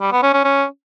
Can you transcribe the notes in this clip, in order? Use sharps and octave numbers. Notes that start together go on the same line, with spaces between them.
G3
B3
C#4
C#4
C#4